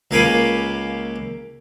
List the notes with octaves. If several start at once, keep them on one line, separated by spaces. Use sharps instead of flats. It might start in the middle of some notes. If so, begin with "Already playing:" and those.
C#2 A#3 F5 G#5 B5 D6